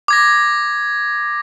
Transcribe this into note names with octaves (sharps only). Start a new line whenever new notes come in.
D6 G#6 A#6